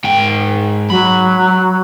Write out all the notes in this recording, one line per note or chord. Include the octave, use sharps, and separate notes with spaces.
G#2 G5
F#3 B5